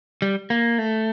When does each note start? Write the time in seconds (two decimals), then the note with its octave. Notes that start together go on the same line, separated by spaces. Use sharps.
0.22 G3
0.50 A#3
0.79 A3